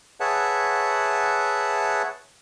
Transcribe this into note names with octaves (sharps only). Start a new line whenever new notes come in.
G#4 B4 C#5 E5 F#5 A5